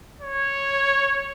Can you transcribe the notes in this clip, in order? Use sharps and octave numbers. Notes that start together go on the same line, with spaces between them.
C#5